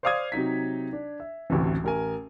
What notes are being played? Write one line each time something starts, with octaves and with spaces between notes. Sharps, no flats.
C5 D5 F5 D6 D#6 G#6
C3 F#3 D#4 B6
D4
E5
A1 D2 C3 E3
A1 A#4 G#5